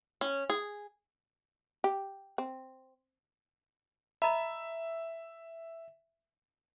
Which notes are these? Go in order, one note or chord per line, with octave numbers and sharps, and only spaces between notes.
C#4
G#4
G4
C4
D#5 E5 A#5 B5